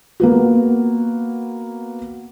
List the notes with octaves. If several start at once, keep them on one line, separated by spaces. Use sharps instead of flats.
A#3 B3 F#4